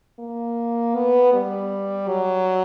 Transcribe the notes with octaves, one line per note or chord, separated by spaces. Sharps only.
A#3
B3
G3
F#3